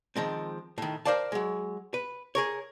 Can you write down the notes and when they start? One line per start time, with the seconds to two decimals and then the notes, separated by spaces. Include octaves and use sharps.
0.16 D#3 F3 G#3 C4
0.78 A2 D#3
1.05 A#4 C5 D5 F5 A5
1.32 F#3 G#3
1.94 B4
2.35 G#4 A#4 C#5